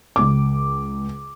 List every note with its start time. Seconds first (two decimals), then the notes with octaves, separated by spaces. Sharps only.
0.16 C#2 D6